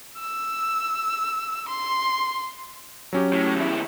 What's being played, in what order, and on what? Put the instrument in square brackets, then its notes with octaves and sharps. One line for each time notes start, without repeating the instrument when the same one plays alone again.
[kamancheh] E6
C6
[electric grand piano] F#3 C#4 G4
[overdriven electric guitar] A2
D#2 E4